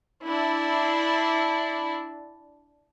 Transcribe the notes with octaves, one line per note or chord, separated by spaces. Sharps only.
D4 E4